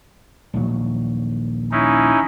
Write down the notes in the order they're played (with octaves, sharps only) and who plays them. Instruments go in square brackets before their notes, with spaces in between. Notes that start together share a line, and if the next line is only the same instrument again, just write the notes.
[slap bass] A#1 D#2 F#3
[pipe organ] C#4 D#4 E4